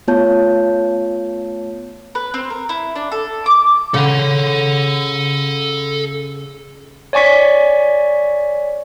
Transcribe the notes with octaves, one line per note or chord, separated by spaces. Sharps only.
A3 B3 F4 C#5 A5 G6
B4
C4
A#4
E4
D4
A4
D6
C#3 A4 F#5
C#5 D5 G#5 C#6 B6